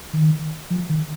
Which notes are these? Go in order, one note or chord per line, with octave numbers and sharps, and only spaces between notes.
D#3
F3
D#3